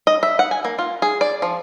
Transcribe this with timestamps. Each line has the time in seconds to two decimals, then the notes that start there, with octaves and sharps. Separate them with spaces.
0.07 D#5
0.23 E5
0.39 F#5
0.51 G#5
0.65 A#3
0.79 F4
1.02 G#4
1.21 D5
1.42 F3